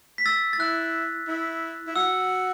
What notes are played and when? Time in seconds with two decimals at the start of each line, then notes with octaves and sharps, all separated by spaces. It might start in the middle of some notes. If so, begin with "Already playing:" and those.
0.18 B6
0.26 E6 A6
0.53 A6
0.59 E4 F#6
1.28 E4
1.87 E4
1.95 F#4 E6